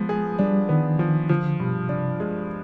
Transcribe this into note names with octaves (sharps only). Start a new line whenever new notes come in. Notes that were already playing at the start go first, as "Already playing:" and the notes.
Already playing: F3 G#3 B3
G#4
G3 D4
D#3 B3
D#3 F3
D3 F3
G2 B2
C3 D4
G#3